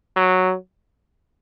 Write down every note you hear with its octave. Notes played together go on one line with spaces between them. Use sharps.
F#3